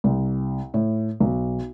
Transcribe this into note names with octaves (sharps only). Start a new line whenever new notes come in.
C2
A2
B1